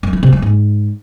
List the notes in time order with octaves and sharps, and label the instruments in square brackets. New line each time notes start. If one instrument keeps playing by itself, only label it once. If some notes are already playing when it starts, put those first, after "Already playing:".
[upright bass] F#2
E3
C3
F#3
G#2